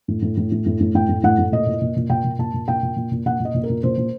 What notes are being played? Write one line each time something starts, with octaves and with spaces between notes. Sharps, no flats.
A2
A2
A2
A2
A2
A2
A2 G5
A2
A2 F#5
A2
A#2 D#5
A#2
A#2
A#2
A#2 G5
A#2
A#2 A5
A#2
A#2 G5
A#2
A#2
A#2
A#2 F#5
A#2 D#5
A#2
A#4
A#2
A#2 C5
A#2